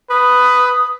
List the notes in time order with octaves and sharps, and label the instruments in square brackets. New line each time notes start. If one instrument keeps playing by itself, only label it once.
[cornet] B4 [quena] D#6